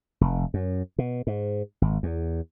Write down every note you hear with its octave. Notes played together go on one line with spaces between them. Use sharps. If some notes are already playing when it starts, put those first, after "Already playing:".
F1
F#2
B2
G#2
G#1
E2